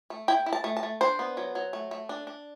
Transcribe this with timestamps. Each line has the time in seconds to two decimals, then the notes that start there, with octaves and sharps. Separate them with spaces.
0.10 A3
0.28 E4 G5
0.46 E4
0.53 A5
0.64 A3
0.77 A5
0.83 A3
1.01 D4 C5
1.19 B3
1.37 F#3
1.55 F#3
1.73 A3
1.91 A3
2.09 D4
2.27 D4